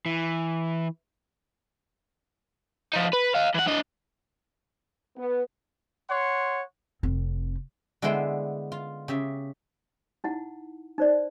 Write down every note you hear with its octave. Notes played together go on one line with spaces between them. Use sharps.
E3
F3 D#4
B4
D#5 F5
E3 F#5
D4 D#5
B3
C#5 F#5 C6
F1 C4
D3 G#3 B3 E4 C5 G5
F4
C#3 G4 E5
D#4 E4 F#5
D#4 C5 D5